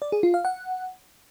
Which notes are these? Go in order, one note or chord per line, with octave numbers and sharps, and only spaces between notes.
D5
G#4
F4
F5
F#5